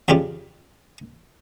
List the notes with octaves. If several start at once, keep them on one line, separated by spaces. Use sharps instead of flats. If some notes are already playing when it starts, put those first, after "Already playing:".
F2 C#3 G3 F4 G4